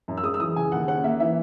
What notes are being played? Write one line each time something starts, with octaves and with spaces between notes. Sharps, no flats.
F#2
E6
G#3 D#6
E6
E3 D#6
C#3 G#5
D#2 F#5
C#4 F#5
A#3 E5
E3 E5